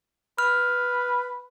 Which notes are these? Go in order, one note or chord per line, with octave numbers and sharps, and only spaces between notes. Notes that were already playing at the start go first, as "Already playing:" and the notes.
B4 F6